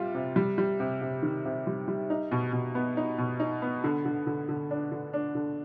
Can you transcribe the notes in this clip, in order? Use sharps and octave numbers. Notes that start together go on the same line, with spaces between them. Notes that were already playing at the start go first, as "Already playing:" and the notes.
Already playing: C3 G3 F4
C3
G3
G3
C3
C3
D#3
C3
G3
G3
D#4
B2
B2
B3
D#4
B2
D#4
B3
D3
D3
D3
D3
D4
D3
D4
D3